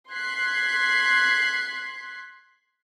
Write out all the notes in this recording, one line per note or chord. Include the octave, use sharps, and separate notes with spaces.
C6 F#6 G#6 B6 C7